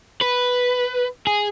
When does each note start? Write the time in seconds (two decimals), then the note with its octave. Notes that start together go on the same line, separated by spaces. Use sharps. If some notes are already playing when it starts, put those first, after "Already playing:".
0.22 B4
1.27 G#4